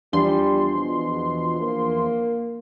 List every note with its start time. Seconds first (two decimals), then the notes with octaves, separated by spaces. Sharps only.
0.13 E2 F3 G3 D4 C6
0.74 B2
1.60 A#3